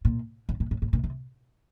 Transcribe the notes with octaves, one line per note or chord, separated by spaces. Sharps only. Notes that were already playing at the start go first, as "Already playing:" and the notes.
A#2
A2
A#2
A2
A2
A#2
C3